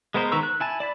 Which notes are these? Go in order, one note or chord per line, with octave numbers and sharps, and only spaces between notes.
G#3 B3 A#4 C5 C6
D#3 B4 A#5 C#6 E6
F#6
E4 G#5 A5
D5 A5 B5